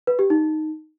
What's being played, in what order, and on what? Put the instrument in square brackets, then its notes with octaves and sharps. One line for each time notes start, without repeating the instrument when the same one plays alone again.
[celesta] B4
G4
D#4